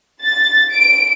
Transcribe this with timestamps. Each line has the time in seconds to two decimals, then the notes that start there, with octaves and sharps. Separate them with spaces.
0.22 A6
0.71 D7